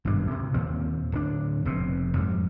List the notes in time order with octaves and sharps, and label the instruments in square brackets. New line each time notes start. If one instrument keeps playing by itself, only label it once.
[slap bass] G#1 G2 B2 D4
D2 C3
D#2 A#2 C4
D1 D4
F1 B2 C4
F2 G#2 G3